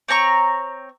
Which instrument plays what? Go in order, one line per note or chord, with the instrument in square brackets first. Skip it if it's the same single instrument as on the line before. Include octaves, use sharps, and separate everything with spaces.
[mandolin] C4 C#5 A#5 C#6